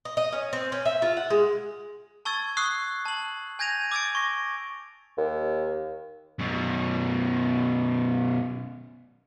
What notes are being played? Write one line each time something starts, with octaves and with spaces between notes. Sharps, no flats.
D#5
D#5
C#4
C4
C#4
E5
F4
F#5
G#3
A5 C#6 E6 G#6 A6
C#6 D#6 E6 F#6 C7
A5 F#7
G#5 G6 G#6 A#6 D#7 F7
D6 E6 G#6 A6 D7
C#6 A#6
D#2
F#2 B2